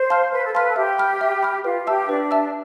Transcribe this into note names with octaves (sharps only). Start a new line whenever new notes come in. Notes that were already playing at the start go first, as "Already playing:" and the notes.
Already playing: C5
F5 A5 C6 F6
B4 C5
A4
B4 F5 A5 C6 F6
A4
G4 E5
B5 F6
E5
B5 F6
F4 B4
G4 E5 A5 E6
D4 B4
E5 A5 E6